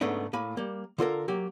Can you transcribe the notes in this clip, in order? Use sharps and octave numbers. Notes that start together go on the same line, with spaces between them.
G#2 C#3 A3 B3 D4 D#4
A2 A#3 G#5 B5
G3 A#3
D3 F4 A4 A#4
F#3 A#3 G4